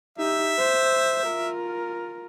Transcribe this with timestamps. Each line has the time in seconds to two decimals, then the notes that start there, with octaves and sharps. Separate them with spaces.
0.18 D#4 G4 E5
0.58 C5
1.25 F4 A#4